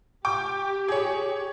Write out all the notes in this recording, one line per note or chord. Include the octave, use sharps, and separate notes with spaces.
G4 G5 D6
G#4 C#5